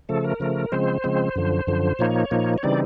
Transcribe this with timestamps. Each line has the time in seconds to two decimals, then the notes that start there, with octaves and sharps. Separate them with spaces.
0.09 C#3 F3 A3 A4
0.24 A#4
0.40 C#3 F3 A3
0.72 C#3 F3 G#3 C4 C5
1.04 C#3 F3 G#3 C4
1.36 F#2 D3 F3
1.67 F#2 D3 F3
1.99 A#2 F3 A#3 D#4 C#5
2.31 A#2 F3 A#3 D#4
2.58 C#5
2.63 C#3 E3 G3 C4 D#4 D5